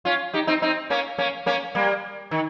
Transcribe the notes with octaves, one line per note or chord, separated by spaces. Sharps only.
C#4 F4
D#4 G4
C4 D#4
C4 D#4
A#3 C#4
A#3 C#4
A#3 C#4
G3 A#3
D#3